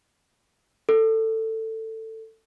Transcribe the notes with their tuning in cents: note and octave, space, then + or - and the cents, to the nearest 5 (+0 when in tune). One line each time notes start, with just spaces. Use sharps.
A4 +15